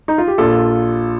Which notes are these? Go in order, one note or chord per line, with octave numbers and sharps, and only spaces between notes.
D#4
F4
G4
A#1 A#2 F4 A4